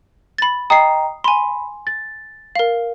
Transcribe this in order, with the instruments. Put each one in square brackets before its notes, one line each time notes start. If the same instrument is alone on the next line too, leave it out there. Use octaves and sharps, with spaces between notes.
[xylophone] B5 A6
[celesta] D#5 G5 A#5 [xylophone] D#6 C7
[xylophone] G#5 C6 [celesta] B5
[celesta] A6
[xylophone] A#4 F5